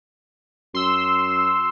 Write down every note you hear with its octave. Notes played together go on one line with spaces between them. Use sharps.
F#2 C6 E6